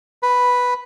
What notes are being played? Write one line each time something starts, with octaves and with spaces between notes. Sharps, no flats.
B4